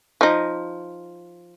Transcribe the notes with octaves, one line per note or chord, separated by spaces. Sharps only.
F3 D#4